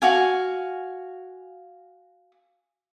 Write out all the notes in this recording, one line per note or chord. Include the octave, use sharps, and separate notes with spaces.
F#4 F5 G#5